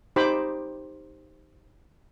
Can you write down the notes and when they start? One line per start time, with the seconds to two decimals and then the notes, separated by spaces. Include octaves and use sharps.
0.16 D#4 G4 C5 G5 B5 D6